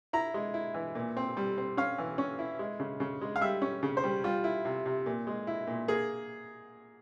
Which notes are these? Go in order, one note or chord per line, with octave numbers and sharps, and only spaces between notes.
E4 A#5
G#3
E4
E3
A#2
C4
G3
C4
C#4 F5
E3
C#4
E4
G#3
C#3
C#3
G#3
F5
G3 E5
C#4
C#3
C5
G3
G3 F4
E4
C3
C3
A#2
G#3
E4
A#2
A#3 G#4